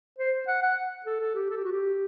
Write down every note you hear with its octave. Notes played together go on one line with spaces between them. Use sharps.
C5
F#5
F#5
A4
A4
G4
A4
G4
F#4
G4